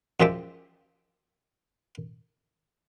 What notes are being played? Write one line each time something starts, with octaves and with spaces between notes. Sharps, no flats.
F#2 F3 G#3 G4 E5 G5